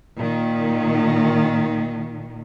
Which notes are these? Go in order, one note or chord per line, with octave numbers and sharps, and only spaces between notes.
A#2 D#3